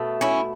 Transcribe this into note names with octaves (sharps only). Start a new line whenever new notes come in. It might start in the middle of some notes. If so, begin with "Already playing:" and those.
Already playing: B2 A3
C#4 E4